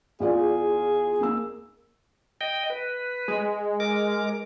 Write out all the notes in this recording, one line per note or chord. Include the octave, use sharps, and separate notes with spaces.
E2 F4 G#4 D5
A#3 E6
D#5 G5
B4
G#3
A#4 D6